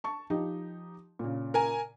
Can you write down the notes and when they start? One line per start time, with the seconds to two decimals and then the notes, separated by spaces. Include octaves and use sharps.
0.04 A5 C#6
0.30 F3 D#4 G4
1.19 A#2 C#3
1.54 A#4 G#5